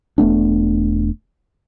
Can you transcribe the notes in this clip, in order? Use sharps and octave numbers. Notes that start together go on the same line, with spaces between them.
E1 A3 B3 D4